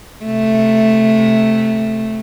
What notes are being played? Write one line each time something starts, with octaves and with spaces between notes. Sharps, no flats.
C3 A3